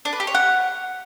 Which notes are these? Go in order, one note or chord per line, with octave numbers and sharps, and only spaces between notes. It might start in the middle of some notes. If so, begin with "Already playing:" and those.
D4
B4
G4
C#5
F#5